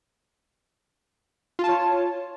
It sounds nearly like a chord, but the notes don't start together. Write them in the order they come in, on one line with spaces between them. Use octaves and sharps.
F4 A5 C#5